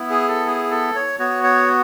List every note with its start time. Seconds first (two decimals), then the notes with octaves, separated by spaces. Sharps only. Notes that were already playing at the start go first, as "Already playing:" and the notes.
Already playing: B3 E4
0.10 G#4
0.28 A4
0.47 G#4
0.71 A4
0.95 C#5
1.19 B3 F#4 C#5
1.44 C#5